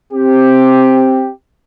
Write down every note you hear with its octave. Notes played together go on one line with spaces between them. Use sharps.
C4 G4